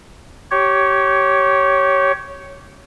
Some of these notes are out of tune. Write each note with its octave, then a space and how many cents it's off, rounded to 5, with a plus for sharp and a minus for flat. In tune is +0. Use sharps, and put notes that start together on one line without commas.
G4 -20 C#5 +0